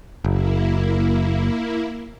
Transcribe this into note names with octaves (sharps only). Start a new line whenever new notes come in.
F#1 A#3 E4